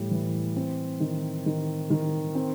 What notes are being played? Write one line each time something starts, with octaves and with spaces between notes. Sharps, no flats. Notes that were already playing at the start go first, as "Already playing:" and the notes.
Already playing: A2 E3 G3
E3
C4
D#3
D#3
D#3
C4